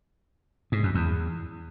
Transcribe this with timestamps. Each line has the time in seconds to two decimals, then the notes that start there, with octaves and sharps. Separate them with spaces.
0.72 G#2
0.83 F#2
0.95 E2